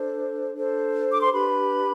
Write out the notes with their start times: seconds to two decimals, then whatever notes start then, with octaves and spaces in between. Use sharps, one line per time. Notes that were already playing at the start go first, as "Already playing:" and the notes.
Already playing: D4 A4 C5
0.54 D4 A4 C5
1.11 D6
1.22 C6
1.33 D4 G4 B4 B5